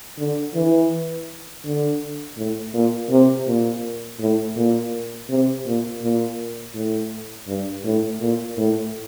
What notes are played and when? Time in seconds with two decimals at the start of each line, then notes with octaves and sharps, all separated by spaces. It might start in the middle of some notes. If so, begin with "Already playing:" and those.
0.18 D3
0.55 E3
1.65 D3
2.37 A2
2.74 A#2
3.10 C3
3.47 A#2
4.20 A2
4.56 A#2
5.29 C3
5.66 A#2
6.01 A#2
6.74 A2
7.48 G2
7.84 A2
8.20 A#2
8.57 A2